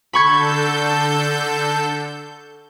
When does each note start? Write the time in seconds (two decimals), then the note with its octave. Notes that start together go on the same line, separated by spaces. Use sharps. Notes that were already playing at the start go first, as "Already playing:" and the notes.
0.13 D3 A4 B5 C#6 G6 G#6